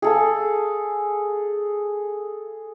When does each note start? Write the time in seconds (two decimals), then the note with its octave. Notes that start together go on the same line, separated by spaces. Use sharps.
0.02 G#4 A4 F5